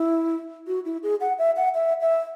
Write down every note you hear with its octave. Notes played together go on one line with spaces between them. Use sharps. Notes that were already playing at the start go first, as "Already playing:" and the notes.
Already playing: E4
F#4
E4
G#4
F#5
E5
F#5
E5
E5